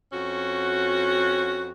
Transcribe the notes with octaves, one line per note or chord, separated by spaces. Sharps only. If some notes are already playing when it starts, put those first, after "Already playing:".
F2 C#4 F#4